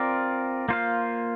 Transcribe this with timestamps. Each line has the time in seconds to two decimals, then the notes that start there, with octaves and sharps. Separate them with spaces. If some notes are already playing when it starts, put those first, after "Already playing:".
Already playing: C4 F4 A#4 D5
0.69 A#3 F4 C5 F5